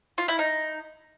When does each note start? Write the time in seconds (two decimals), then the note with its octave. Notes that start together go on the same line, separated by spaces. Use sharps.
0.18 F4
0.28 E4
0.39 D#4